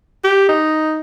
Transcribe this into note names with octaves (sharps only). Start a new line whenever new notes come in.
G4
D#4